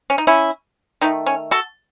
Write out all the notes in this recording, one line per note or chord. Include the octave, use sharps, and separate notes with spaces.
C#4
D#4
C#4 E4
D#3 A3 D#4
C#4
F#4 A4